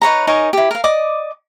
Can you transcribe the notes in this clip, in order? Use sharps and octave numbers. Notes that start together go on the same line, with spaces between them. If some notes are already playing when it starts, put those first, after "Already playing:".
D#4 B4 C#5 A#5
D#4 A#4 C#5 G#5
E4 G4
A#4 F5
D5 D#5 D6